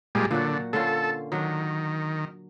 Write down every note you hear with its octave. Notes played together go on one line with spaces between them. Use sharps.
A#2 G3 G#3
A#2 D3 F#3 F#4
D3 C#4 F4 A4
D#3 F#3 D4